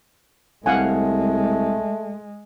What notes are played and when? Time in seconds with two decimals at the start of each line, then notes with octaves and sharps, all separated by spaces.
0.66 C2 G#3 A3 F5 F#5 G#5